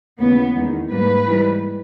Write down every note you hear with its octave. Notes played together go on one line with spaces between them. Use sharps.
D#2 C#3 E3 B3
E2 D#3 G#3
G#2 G3 A#3 B4
G#2 E3 G3